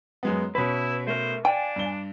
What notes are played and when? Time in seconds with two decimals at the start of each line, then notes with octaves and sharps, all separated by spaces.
0.23 F#2 G#3 B3
0.55 B2 C#4 E4 B4 B5
1.07 A3 A#4 C5
1.45 D4 D5 F5 G5 G#5
1.76 G2 G7